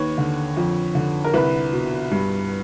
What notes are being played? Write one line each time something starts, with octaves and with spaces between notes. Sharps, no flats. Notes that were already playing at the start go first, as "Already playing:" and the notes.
Already playing: D#2 B4 C#5
D3
F2
D3
A#4
C2 B4
B2
G2